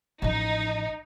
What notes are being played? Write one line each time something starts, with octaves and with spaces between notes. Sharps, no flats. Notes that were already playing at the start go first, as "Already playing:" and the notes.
A1 F3 D#4